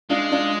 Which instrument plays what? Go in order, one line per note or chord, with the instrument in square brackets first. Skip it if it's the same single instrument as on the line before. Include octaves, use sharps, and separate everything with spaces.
[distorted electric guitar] G#3 [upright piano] D4 F4
[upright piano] D4 F4